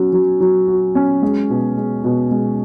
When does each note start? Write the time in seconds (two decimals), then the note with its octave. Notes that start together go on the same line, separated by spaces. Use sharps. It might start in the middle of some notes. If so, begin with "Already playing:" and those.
Already playing: F#3 C#4 F#4
0.13 F#3
0.40 F#3
0.68 F#4
0.95 C#4
1.22 G#3
1.50 B2
1.77 G#3
2.04 B2
2.31 G#3